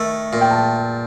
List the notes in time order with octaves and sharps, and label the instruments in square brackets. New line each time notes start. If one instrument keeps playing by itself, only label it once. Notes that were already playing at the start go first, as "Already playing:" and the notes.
Already playing: [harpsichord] D#3 A3
A#2
[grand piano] G5
A5